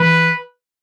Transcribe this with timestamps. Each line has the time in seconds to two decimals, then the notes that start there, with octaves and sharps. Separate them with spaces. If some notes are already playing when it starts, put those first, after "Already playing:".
Already playing: E3 B4